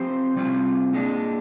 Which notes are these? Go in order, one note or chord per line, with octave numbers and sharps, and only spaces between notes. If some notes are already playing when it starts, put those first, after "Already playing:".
Already playing: F3 C4 G4 C5
C3 G3 C4 F4
A#2 G#3 D4